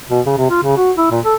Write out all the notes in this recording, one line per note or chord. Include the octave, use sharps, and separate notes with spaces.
B2
C#3
C3
F4
C#3
F#4
E4
A#2
A4